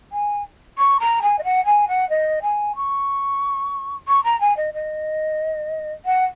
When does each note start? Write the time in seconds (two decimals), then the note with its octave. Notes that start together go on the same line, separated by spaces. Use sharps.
0.12 G#5
0.77 C#6
1.00 A#5
1.22 G#5
1.38 D#5
1.44 F#5
1.65 G#5
1.88 F#5
2.09 D#5
2.42 G#5
2.75 C#6
4.07 C#6
4.23 A#5
4.40 G#5
4.57 D#5
4.74 D#5
6.05 F#5